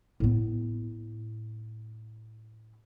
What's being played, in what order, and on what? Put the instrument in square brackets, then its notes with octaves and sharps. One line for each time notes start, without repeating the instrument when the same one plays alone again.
[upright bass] A2 B3